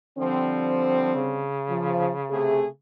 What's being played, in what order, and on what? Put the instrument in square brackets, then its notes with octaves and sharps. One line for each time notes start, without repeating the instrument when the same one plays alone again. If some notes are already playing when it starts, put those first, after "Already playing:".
[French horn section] D3 G3 C4 [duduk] F3
[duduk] C#3
[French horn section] F3
C3 A3 G#4